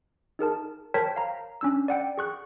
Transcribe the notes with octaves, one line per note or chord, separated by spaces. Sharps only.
D#4 G#4 A#4 A5
A#4 C5 C#5 G5 A5 B6
F5 A#5
C#4 D4 E6
D5 F#5 G5
G#4 C#6 F#6